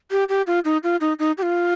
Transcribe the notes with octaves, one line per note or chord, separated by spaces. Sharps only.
G4
G4
F4
D#4
F4
D#4
D#4
G4
F4